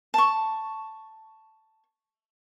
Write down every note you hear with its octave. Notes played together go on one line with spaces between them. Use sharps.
A5 C#6